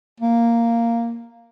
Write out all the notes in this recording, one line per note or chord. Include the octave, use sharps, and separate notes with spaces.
A#3